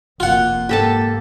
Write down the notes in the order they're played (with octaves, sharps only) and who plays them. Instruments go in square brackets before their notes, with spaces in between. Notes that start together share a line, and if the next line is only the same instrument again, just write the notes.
[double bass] F1 A#3 [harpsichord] F4 F#5
[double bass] G#2 A#3 [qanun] G4 A4 A5